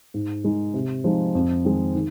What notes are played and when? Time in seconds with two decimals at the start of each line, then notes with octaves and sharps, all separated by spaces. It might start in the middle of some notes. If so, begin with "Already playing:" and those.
0.14 G#2
0.44 G#3 D#4
0.74 C3
1.04 F3 G#3 D#4
1.35 F2
1.64 D#3 G#3 C4 D#4
1.95 D#3